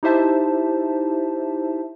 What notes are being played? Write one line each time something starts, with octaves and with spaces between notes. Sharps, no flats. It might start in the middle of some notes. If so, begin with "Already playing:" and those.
D#4 E4 G4 C5 E5 A5